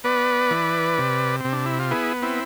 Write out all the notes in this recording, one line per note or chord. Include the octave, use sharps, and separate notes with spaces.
B3 B4 D5
E3
C3
C3 C4
D4
E4
F4
B3 E4 G#4
C4 E4